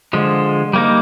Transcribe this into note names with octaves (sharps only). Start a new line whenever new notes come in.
D3 F3 G#3
G3 A#3 D#4